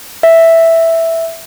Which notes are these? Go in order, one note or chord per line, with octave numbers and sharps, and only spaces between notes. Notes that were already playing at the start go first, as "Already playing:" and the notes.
E5